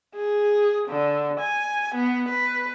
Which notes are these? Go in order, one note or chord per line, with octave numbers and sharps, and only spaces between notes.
G#4
D3
G#5
B3
B4